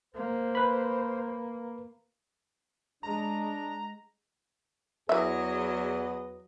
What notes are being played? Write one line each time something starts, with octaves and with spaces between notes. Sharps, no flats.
A#3 C5
B4 B5
G#3 D4 A#5
E2 E3 F#3 G#4 B4 D#5 E5